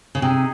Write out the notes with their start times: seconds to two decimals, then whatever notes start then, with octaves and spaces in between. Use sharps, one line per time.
0.15 C#3
0.22 C3 D#4 G#4